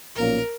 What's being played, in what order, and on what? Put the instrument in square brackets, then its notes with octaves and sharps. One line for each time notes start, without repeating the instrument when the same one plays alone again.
[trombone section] B1 A#2 F3 A#3 C#4 [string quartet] A#4